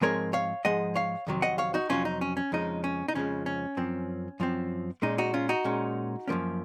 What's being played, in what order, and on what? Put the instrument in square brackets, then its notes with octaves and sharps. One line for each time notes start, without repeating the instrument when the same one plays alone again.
[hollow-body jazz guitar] G#2 F3 G#3 C4 A#4 C#5
C#5 F5
G#2 F3 G#3 D#5 F#5
C#5 F5
F2 C3 D#3 F#3
D#5 F#5
C#5 F5
D#4 F#4
F2 C3 D#3 F#3 C#4 F4
D#4
C#4
C#4
F2 C#3 F3 G#3 D#4
C#4
D#4
F2 C#3 F3 G#3 C#4
C#4
F#2 F3 C4
F#2 F3 C4
A#2 G#3 C#4 D#4
D#4 F#4
C#4 F4
D#4 F#4
A#2 G#3 C#4
F#2 F3 A#3 C#4